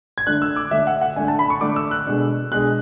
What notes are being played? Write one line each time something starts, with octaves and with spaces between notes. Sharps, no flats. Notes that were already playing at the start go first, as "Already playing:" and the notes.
G#6
D3 A3 D4 F#6
E6
D6
D3 A3 D4 E5
F#5
F#5
D3 A3 D4 G#5
A5
B5
C#6
D3 A3 D4 D6
E6
F#6
B2 G#3 D4
B2 G#3 D4 F#6